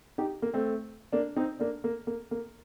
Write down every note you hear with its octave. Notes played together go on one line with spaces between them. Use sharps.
D#4 G4
A#3
A3 C4
A#3 D4
C4 D#4
A#3 D4
A#3
A#3
A#3